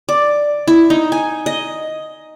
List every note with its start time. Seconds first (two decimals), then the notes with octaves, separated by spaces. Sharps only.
0.09 D5
0.68 E4
0.90 D#4
1.12 G#5
1.46 D#5